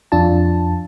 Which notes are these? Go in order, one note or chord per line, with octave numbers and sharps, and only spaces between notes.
F2 D4 F4 A5